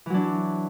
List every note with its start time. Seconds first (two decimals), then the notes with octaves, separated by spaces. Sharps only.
0.06 E3
0.10 F#3
0.14 D4